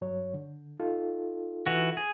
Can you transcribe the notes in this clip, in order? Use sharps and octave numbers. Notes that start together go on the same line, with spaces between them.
G2 F#3 C#5
D3
D#4 F4 A4
E3 F#4
G#4